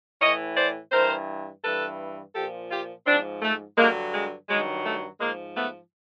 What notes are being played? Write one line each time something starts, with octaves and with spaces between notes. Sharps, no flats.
A2 E3 C#5 D#5
C5 D5
G2 E3 A#4 C5
G2 E3 A4 B4
A#2 F3 G4 A4
F4 G4
G#2 F3 C4 D4
A3
G2 D3 F#3 G#3 A#3
G#3
G2 D#3 F#3 G#3
A3
G#2 F3 G#3 A#3
A3 B3